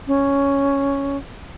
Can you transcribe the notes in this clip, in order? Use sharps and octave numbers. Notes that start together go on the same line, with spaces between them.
C#4